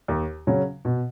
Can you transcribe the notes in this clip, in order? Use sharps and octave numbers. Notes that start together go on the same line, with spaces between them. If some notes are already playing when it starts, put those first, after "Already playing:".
D#2
C#3 F#3 C#4
B2